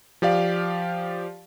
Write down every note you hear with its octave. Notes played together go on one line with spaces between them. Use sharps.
F3 G4 D5 F5